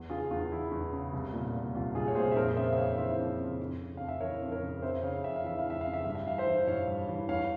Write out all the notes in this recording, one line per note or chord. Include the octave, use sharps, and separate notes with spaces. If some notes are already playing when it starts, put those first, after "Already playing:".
Already playing: E2
C#3 F4 G#4
E2 F4
E3 E4
E2
C#3
C2
A#2
A#2
C2 F4
C2 F4 G#4
C#5
A#2 G#4 C5
E5
F2 A#4 C#5
C#3 C5 E5
E5
F2 C#5 F5
E3 C5 E5
F2
C#3
F2
C#3
F2 F5
E5
E3 A#4 C#5
F2
A#4 C#5
C#3
F2 C5 E5
C#3 C#5 F5
F2 E5
F5
E3 E5
F5
F2 E5
F5
C#3
E5
G2 F5
E5
E3 F5
C5 E5
E3
G2 C#5 F5
G2
E3
E2 C#5 F5